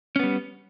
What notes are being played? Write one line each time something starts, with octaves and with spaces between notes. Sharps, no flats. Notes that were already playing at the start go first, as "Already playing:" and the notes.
G3 B3 C#4